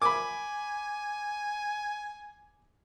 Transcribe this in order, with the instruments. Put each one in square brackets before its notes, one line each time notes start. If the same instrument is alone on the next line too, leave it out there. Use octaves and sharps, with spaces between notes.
[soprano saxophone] G#5 [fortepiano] B5 D6